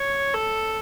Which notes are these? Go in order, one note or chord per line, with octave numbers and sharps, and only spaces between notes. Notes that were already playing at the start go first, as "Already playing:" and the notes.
Already playing: C#5
A4